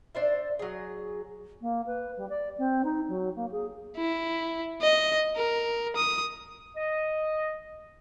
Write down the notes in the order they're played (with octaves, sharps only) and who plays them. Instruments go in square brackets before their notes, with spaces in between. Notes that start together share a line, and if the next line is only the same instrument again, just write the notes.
[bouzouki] D4 C5 E5
F#3 G#4
[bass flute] A#3
B4
G3
D5
C4
D#4
F#3
A#3
G#4
[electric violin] E4
D#5
A#4
D#6
[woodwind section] D#5